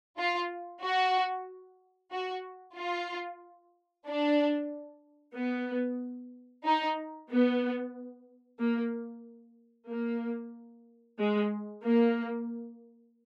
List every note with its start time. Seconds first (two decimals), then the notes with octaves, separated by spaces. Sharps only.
0.17 F4
0.81 F#4
2.12 F#4
2.76 F4
4.05 D4
5.35 B3
6.65 D#4
7.30 B3
8.60 A#3
9.89 A#3
11.19 G#3
11.84 A#3